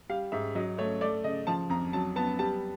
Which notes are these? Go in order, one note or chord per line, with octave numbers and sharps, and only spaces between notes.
G3 F5
G#2 E5
F#3 D#5
A3 C#5
A3 D5
C#3 D#5
F3 A5
F2 A#5
F#3 A5
B3 A5
G3 A5